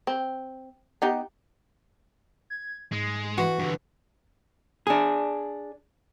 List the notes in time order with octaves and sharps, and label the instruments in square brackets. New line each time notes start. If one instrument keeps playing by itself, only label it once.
[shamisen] C4
B3 D#4 G4
[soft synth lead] G#6
[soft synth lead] G#2 [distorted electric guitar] G#3
[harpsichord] E3 [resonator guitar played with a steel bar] F#4
[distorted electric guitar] G2 D3 [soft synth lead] B4
[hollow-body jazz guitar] D4 G#4